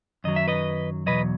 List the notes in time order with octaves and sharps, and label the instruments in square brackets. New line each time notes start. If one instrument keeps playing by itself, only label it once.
[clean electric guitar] F#2 D#3 F#3 D#5
E5
B4 D#5
E2 B2 F#3 B4 D#5